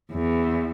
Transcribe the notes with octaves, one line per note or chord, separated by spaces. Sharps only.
E2